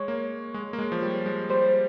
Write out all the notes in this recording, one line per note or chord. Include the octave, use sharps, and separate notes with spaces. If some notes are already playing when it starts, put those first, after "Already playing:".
Already playing: G#3 C#5
A#3
G#3
A#3
G#3
F3
G3
G#3
G3 C5